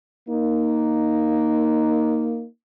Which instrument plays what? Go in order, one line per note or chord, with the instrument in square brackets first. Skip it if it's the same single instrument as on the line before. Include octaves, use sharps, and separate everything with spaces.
[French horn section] A#3 D#4